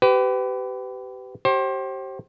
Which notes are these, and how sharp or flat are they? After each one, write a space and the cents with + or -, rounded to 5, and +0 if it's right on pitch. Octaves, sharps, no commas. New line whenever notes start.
G4 -25 B4 +30
G4 -30 C5 +30